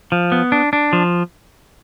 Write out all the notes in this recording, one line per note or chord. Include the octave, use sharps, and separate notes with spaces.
F3
B3
D4
D4
F3